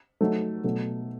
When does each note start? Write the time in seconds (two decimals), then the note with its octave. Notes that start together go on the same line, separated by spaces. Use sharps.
0.21 F#3 A3 D#4
0.64 B2 F#3 A3